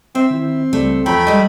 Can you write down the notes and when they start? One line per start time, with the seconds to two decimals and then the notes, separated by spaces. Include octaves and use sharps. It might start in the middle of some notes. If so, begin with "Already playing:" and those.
0.15 C4 E5
0.30 D#3 C4 E4
0.73 C#2 G3 A3 D5
1.06 E2 F3 A3 C#4 G5 A#5 B5
1.27 G3 G#3 D#5